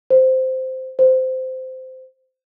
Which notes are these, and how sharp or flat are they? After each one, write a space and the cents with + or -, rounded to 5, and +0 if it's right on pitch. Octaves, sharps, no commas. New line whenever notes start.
C5 -10
C5 -15